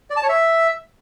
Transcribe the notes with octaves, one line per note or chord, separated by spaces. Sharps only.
D5
A5
C#5
E5